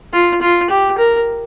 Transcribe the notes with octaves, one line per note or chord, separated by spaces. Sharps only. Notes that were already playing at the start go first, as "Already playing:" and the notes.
F4
F4
G4
A#4